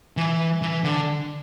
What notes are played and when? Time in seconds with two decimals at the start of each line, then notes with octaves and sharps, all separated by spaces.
0.17 E3
0.62 E3
0.84 D3